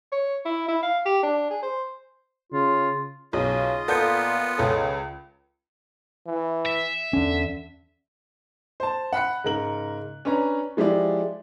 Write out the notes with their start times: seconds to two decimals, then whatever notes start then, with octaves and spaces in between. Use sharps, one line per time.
0.12 C#5
0.45 E4
0.68 E4
0.83 F5
1.06 G4
1.23 D4
1.50 G#4
1.63 C5
2.53 C#3 F4
3.33 B1 C#3 F4 D#5
3.88 A#2 B3 A4 G6
4.58 C#2 C#3 A4
6.27 E3
6.66 E5
7.13 E2 D3 C#4
8.80 C5 A5
9.13 F#5 B5 F#6 C#7
9.44 G#2 C#3 A#4 F#7
10.25 C#4 D4 B4 C#5 A#5
10.77 F3 G#3 E4 G4 D5